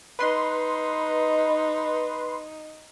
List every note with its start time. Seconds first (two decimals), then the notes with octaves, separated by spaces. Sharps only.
0.19 D#4 B4 C6